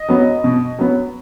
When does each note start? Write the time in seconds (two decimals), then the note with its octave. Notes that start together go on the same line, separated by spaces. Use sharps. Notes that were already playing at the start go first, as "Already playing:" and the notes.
Already playing: D#5
0.09 F#3 B3
0.44 B2
0.79 F#3 B3